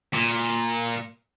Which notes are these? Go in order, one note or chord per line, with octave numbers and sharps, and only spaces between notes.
A#2